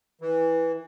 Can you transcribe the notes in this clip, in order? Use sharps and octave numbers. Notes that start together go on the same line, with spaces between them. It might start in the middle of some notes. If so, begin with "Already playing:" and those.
E3